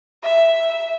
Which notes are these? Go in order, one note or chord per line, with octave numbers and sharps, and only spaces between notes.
E5